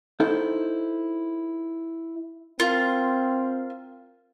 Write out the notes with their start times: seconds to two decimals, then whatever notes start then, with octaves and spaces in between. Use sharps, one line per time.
0.20 D#4 E4 A4 C5
2.60 C4 F4 A#4 F5